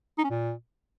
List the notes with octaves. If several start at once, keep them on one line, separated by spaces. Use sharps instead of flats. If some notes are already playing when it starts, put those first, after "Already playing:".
D#4
C#4
A#2